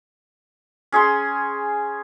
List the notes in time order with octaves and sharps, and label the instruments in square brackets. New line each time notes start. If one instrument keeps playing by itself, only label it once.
[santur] C#4 G#4 G#5 C6